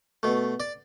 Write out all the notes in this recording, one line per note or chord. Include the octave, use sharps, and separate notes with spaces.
B2 A3
D5